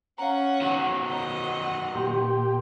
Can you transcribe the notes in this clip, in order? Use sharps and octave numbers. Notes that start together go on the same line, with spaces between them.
C#4 F5 F#5 A#5
D#3 F#3
D#5 F#5 A#5
A#2 G4 C6